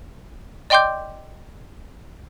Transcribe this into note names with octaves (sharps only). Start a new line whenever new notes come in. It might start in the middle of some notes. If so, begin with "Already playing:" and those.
D5 D#5 G5 C6 D6 G6